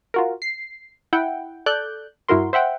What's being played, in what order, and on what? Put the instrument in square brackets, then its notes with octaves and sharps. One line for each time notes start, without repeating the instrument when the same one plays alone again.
[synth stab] F4 F#4 A#4
C7
E4 F#5 G5
A4 D5 F#6 G6
G2 E4 F#4 A#4 C6
C5 E5 F#5 G5